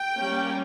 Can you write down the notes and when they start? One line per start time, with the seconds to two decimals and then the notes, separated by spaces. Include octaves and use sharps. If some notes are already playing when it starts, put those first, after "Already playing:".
Already playing: G5
0.17 G3 A#3 C#4